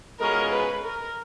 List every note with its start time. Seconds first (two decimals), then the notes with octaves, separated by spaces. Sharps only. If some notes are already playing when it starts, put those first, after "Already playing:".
0.20 B2 G#3 C#4 F4 G#4 A#4
0.52 B4
0.84 A#4